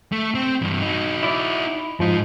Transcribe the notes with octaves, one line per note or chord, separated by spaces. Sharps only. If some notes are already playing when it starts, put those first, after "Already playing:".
A3
C4
G2 E3
D#4 F#4
E4 D5
G#2 F3 D#4